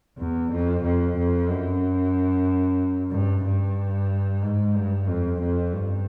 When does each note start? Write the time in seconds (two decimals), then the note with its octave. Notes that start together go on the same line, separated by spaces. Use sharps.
0.18 E2
0.51 F2
0.83 F2
1.16 F2
1.49 F#2
3.12 G2
3.44 G2
4.42 G#2
4.75 G2
5.08 F2
5.40 F2
5.73 G2